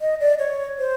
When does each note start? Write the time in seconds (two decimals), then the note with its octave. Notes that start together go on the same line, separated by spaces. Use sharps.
0.01 D#5
0.20 D5
0.39 C#5
0.79 C5